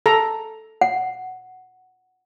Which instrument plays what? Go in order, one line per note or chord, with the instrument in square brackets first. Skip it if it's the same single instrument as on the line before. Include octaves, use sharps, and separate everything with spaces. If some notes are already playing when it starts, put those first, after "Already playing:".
[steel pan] A4 A#5
[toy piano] F#5